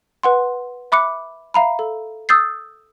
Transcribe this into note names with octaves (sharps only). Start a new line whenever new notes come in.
B4 F#5 C6
E5 B5 D6 F#6 C#7
E5 F5 A#5 B5
A4
D#6 E6 G6 A6 C7